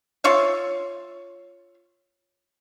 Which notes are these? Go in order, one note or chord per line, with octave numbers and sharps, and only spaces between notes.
F4 C#5 E5 F5